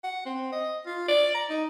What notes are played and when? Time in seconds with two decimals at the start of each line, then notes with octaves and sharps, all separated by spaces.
0.04 F#5
0.26 C4
0.52 D#5
0.87 F4
1.09 D5
1.35 A#5
1.50 D#4